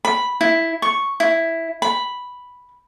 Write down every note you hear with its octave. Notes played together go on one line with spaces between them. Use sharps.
B5
E4
C#6
E4
B5